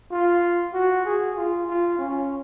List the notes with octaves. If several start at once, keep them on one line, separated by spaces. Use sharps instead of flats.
F4
F#4
G#4
F4
F4
C#4